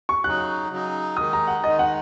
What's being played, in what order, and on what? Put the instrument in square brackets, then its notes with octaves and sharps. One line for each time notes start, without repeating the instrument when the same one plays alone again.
[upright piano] C#6
[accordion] C#3 F#3 D#4 [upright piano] F#6
[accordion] C#3 F#3 D#4
[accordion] D#3 G#3 D#4 [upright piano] D#6
[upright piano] A#5
F#5
[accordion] D#3 G#3 D#4 [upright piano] D#5
[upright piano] F#5